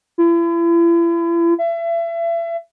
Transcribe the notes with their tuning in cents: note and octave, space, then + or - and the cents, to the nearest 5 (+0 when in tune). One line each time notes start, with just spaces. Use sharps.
E4 +40
E5 +35